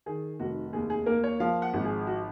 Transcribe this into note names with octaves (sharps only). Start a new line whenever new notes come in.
D#3 G#4
F1 F#4
D#2 G#4
G#4
A#3 A#4
C#5
F3 F5
F#5
G#1
G#4
F#4